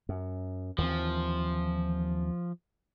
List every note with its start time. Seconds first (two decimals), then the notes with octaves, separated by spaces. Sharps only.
0.09 F#2
0.78 D#2 E3 F3 C4